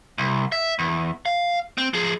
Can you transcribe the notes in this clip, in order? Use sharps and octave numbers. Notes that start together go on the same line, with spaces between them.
C2
E5
E2
F5
C4
F3 G#4